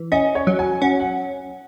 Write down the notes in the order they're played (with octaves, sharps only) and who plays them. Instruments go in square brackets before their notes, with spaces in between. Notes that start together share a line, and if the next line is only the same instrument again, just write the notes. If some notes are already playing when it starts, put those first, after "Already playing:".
Already playing: [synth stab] E3
[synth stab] C#4 [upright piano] D#5
[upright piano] C#5
[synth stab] F#3
[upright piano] G#5
[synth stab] C#4 [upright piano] F#5
[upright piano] F#5